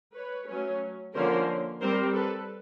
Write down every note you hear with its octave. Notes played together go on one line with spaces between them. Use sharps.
B4 C#5
F#3 A3 C#4
D3 F3 A#3 C#4 A#4 C5
G3 C4 A#4 C5
A4 B4